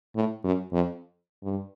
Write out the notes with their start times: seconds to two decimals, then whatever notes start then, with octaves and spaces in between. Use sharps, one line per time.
0.16 A2
0.44 F#2
0.73 F2
1.43 G2